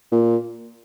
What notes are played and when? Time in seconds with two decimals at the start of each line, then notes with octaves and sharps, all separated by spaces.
0.12 A#2